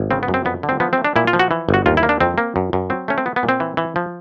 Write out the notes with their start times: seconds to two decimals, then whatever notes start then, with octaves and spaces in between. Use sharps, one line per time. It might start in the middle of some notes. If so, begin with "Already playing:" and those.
Already playing: G#1
0.11 C#3 C4
0.23 B3
0.28 F#2
0.34 C4
0.45 F2 B3
0.63 D3
0.69 C4
0.80 F3 B3
0.93 C4
0.98 A3
1.05 D4
1.16 A#2 E4
1.27 F4
1.33 F3
1.39 F#4
1.51 E3
1.69 G1
1.74 F#4
1.86 D#2 F4
1.97 E4
2.03 A#3
2.09 D4
2.20 F2 C4
2.38 A#3
2.56 F#2
2.73 F#2
2.90 F#3 C4
3.08 A3 C#4
3.18 C4
3.26 B3
3.36 B3
3.43 A#2
3.49 C4
3.60 E3
3.77 E3
3.96 F3